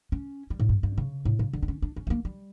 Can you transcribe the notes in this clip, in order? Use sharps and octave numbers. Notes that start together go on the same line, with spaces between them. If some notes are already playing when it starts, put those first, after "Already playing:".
C#4
G3
A2
G2
G2
C#3
A2
C#3
D3
D4
C#4
D4
C#4
A3
A#3
G3